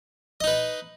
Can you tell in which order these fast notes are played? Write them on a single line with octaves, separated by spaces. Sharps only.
D#5 D#4 B4